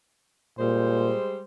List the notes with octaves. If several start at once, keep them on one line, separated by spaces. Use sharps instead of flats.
A#2 G3 G#3 C5